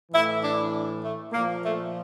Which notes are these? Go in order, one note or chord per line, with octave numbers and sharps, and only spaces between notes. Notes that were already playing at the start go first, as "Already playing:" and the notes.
A2 E3 E4
D4
A3
A#2 F3 A#3
A3